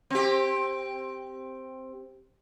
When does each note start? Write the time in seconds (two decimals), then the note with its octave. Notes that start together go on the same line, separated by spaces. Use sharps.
0.10 C4 G4